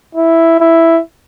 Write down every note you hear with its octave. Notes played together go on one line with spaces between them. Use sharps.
E4
E4